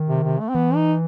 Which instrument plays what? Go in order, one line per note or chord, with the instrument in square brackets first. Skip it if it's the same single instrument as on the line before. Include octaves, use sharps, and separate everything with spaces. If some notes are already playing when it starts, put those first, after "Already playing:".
Already playing: [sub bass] D#3
[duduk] C3
C3
A3
C4
[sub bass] E3 [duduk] B3
[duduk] D#4